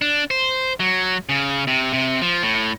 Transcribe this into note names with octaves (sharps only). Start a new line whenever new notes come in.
D4
C5
F#3
C#3
C3
C3
F3
A2